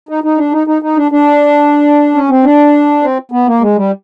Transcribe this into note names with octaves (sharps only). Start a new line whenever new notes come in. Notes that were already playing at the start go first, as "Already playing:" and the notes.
D#4
D#4
D4
D#4
D#4
D#4
D4
D4
C#4
C4
D4
C4
B3
A#3
G#3
G3